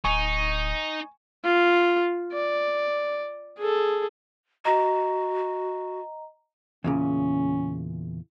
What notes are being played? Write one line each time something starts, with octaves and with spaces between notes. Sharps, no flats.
D1 D#4 G#5 C#6
F4
D5
G#4 A4
F#4 D#5 A#5
E2 A#2 C#3 C#4